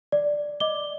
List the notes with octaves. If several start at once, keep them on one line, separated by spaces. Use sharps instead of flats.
D5
D#5 D6 G7